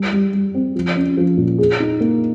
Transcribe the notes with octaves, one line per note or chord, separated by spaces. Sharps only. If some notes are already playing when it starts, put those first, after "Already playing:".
Already playing: G3
G3
G3
C4
F3
C#4
F3
A#2
G#4
D#4
A#3